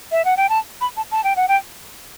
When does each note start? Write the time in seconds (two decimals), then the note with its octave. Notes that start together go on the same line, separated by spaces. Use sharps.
0.12 E5
0.25 F#5
0.37 G5
0.49 A5
0.81 B5
0.97 A5
1.11 A5
1.24 G5
1.36 F#5
1.48 G5